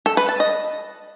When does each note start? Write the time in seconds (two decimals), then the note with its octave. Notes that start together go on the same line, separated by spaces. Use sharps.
0.06 A4
0.17 B4
0.29 A5
0.40 D#5